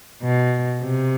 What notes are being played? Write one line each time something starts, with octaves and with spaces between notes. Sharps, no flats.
B2
C3